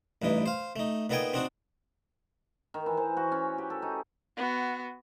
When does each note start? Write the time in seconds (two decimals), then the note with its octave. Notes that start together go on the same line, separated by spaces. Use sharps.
0.22 A1 G2 E3 D#4
0.46 C5 F5
0.76 A3 D#4
1.10 A#2 B3 D#4 A4 G5 G#5
1.34 C4 D4 D#4 F#4
2.74 D#3
2.86 E3
2.97 C5
3.17 F#4
3.32 C#4
3.58 G4
3.70 A4
3.82 D#4
4.37 B3 F#4